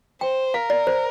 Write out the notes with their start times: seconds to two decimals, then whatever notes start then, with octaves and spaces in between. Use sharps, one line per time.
0.21 C5 G5
0.54 A#4 F5
0.70 D5
0.87 C5